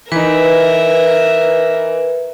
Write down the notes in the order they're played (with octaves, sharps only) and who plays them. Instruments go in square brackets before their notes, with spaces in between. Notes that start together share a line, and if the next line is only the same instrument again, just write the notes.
[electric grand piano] E3 D#4 [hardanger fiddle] A#4 E5 [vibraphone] B4